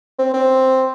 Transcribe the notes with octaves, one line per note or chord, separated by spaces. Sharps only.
C4
C4